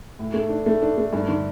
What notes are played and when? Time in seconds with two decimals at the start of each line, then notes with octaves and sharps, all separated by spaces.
0.19 A2
0.34 A3
0.49 D4
0.66 A3
0.82 D4
0.98 A3
1.13 G2
1.28 D3